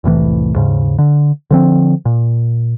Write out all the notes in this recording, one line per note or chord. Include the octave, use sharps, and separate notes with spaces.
F1 C2 A2 E3
D#2 G#2 C#3
D3
D3 F3 C4
A#2